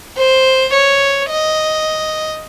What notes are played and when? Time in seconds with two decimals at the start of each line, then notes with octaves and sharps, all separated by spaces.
0.18 C5
0.73 C#5
1.29 D#5